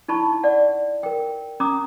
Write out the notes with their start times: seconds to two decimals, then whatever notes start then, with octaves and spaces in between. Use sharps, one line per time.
0.08 D#4 E4 A5 B5 C#6
0.44 D5 F#5
1.03 A#4 G5
1.60 C#4 A#5 D6 D#6